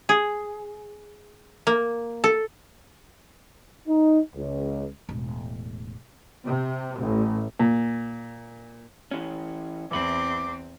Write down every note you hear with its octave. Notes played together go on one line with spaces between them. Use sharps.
G#4
A#3
A4
D#4
C#2
E1 A2
C3
A1
A#2
E3 C#4
E2 E3 C4 B5 D6